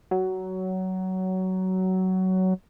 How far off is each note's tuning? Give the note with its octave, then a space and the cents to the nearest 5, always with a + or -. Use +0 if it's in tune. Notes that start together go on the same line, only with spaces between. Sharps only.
F#3 +15